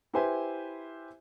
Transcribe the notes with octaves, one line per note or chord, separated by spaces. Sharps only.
E4 G4 B4 C5 E5 G#5